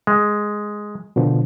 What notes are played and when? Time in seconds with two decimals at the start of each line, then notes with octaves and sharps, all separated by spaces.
0.07 G#3
1.16 B2 D3 F3